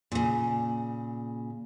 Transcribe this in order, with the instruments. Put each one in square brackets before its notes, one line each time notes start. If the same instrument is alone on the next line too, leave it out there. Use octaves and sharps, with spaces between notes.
[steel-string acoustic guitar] A#2 C#3